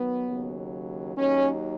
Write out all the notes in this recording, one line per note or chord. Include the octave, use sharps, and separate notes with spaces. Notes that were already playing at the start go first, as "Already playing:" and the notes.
Already playing: D#3 F#3 B3
D#2 C#3 F#3
D#2 D#3 F#3 C#4